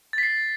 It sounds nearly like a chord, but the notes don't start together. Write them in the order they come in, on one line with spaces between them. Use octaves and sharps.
A6 B6 C7